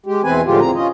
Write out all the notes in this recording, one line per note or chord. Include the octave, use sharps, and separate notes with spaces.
G#3 G4
E2 B2 E3 C4 B4 G#5
A2 D3 F3 G#3 F4 G4
E2 E3 C4 A#5
C#4 F4 D#5